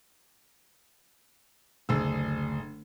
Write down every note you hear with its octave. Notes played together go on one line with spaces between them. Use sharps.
F#1 D2 G#4 E6